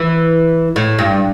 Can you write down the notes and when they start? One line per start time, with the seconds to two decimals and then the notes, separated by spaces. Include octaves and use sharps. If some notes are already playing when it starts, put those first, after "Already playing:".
Already playing: E3
0.76 A2
0.99 G2